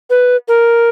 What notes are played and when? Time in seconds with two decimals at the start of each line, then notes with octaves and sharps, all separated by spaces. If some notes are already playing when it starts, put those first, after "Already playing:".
0.10 B4
0.48 A#4